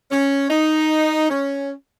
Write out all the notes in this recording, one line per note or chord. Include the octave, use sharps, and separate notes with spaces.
C#4
D#4
C#4